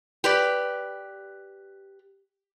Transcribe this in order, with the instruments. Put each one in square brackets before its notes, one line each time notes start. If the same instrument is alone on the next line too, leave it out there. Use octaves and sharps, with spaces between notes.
[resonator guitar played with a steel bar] G4 B4 D5